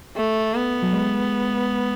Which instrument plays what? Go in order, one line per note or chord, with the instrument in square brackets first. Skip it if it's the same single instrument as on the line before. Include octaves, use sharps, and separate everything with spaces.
[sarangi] A3
B3
[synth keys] F#3
G#3